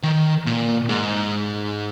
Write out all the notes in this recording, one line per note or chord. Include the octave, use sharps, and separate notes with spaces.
D#3
A#2
G#2